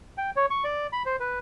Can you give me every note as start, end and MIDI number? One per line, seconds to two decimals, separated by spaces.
0.18 0.31 79
0.36 0.46 73
0.50 0.64 85
0.64 0.87 74
0.93 1.03 83
1.06 1.16 72
1.20 1.39 71